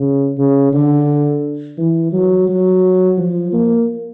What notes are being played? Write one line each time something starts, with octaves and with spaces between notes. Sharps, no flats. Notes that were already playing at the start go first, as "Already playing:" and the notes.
Already playing: C#3
C#3
D3
E3
F#3
F#3
F3
A#3